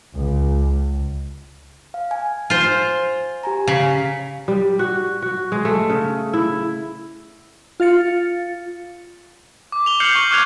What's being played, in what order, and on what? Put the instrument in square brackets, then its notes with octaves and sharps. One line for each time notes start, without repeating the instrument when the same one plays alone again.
[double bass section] C#2
[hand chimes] F5
G#5
[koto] F4 C5
[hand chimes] G4 G#5 A#5
[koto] C#3 [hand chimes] F5 B6
[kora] G3
F#4
F#4
G#3
A3
C#3
E4
[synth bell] F4 F5 A6 C#7
[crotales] D6
F7 G7
F6 G6 C7 C#7 F#7
C#6
D6 F6 F#6 G#6 F7